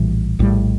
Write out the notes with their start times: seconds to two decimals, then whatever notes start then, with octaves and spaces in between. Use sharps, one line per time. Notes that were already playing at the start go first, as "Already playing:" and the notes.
Already playing: A#1 A2 E3 G3
0.39 A#1 A2 E3 G3